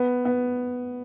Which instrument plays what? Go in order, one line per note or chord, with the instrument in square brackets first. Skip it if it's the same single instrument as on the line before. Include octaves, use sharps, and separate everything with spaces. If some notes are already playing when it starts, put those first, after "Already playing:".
Already playing: [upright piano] B3
B3